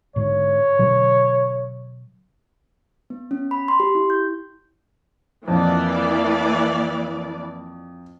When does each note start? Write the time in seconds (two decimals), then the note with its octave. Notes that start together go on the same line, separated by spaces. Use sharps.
0.16 G#2 D3 C#5
0.79 B2 D3 F#3
3.10 B3
3.31 C#4
3.51 B5
3.68 C6
3.80 G4
3.95 E4
4.10 G6
5.48 F2 E3 A#3 D5